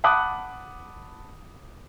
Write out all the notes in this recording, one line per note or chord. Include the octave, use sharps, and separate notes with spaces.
F#5 A5 B5 D6 D#6 F#6